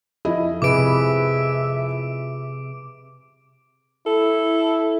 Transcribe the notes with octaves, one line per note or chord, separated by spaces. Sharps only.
F2 E4 D#5
C3 G#4 B4 E5 D6 D7
E4 A4